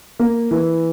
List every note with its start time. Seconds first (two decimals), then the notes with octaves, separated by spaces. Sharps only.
0.19 A#3
0.51 E3